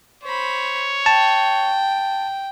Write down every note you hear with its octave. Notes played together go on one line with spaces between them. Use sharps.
C5 C#5 B5
G5 A5